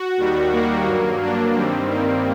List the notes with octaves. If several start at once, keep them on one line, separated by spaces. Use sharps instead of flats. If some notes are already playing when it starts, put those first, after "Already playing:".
Already playing: F#4
D#2 D#3 G3
A#3
G2 F#3
D4
G2 D#3 G3 C4
A#3